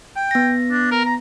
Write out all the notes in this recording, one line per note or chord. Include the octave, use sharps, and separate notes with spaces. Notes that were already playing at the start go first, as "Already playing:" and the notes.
G5
B3 A#6
D4
A#4
A#5